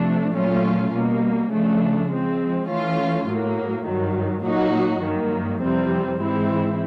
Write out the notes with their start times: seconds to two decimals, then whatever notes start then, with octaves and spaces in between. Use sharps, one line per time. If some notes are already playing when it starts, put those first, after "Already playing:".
Already playing: C3 F3 A3 D4
0.33 A#2 F#3 A3 C#4 F4
0.92 B2 G3 A#3
1.50 C#3 F3 A3 D4
2.10 F3 G#3 C4
2.68 E3 A3 C#4 F4
3.26 A2 F#3 A#3
3.85 G2 D#3 F#3
4.44 A#2 F#3 A#3 D#4 F#4
5.01 G2 D#3 F#3 A#3
5.60 F2 C3 E3 G3 C4
6.19 G#2 E3 G#3 C4 E4